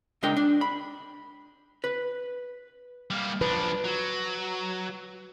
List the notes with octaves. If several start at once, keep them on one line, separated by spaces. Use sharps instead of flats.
C#2 G#3 D4 A#4 G5
D4
B5
B4
G3 A#3
F3 D4 B4
F#3